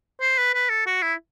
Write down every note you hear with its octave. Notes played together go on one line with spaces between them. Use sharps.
C5
B4
B4
A4
F#4
E4